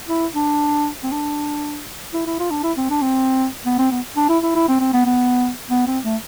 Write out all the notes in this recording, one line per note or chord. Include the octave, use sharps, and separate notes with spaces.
E4
D4
C4
D4
E4
E4
F4
D4
E4
C4
D4
C4
B3
C4
B3
D4
E4
E4
E4
C4
C4
B3
B3
B3
C4
A3